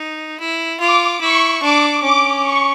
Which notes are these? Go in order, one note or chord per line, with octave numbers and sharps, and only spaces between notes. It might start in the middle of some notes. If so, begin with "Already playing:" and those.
Already playing: D#4
E4
F4 D6
E4 C#6
D4 D6
C#4 D6
C#6